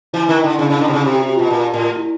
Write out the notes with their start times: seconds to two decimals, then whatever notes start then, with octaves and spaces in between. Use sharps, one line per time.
0.13 E3 E4
0.28 D#3 D#4
0.43 D3 D#4
0.58 C#3 D4
0.70 C#3 D4
0.81 D3 D#4
0.88 C3
0.93 C#3 A4
1.05 C3 G4
1.20 F#4
1.35 B2 F4
1.50 A#2
1.73 A2
1.96 E4